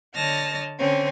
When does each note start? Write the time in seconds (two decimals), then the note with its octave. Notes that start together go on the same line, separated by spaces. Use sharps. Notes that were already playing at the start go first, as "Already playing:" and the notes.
0.15 D3 C#5 D#5 A5 F6 A#6
0.78 D3 C4 C#4